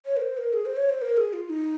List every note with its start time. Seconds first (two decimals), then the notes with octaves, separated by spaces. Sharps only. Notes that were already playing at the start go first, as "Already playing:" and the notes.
0.06 C#5
0.17 A#4
0.22 C5
0.37 A#4
0.53 G#4
0.66 C5
0.77 C#5
0.89 C5
1.02 A#4
1.17 G#4
1.33 F4
1.50 D#4